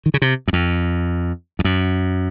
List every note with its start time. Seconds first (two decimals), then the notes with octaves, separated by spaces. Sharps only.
0.06 D#3
0.14 C#3
0.22 C3
0.48 F#2
0.53 F2
1.59 F2
1.64 F#2